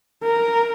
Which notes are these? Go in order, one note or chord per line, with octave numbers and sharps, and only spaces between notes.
A#4